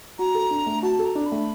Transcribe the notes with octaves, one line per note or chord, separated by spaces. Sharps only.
F#4 A#5
A4
D4
A3
F#4 A5
A4
A#5
D4
B5
A3